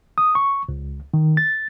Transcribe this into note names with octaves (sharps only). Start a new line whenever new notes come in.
D#6
C#6
C#2
D#3
A6